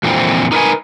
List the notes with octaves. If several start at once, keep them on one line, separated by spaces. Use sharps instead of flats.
F2 A#2 D3 E3 C4
D#4 A#4 B4 G#5